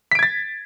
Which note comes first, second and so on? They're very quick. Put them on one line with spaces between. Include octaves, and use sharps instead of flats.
B6 D7 G#6 A6